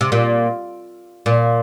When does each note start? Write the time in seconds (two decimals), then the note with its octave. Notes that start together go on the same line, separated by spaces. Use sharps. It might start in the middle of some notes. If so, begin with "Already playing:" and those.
0.01 C3
0.12 A#2
1.26 A#2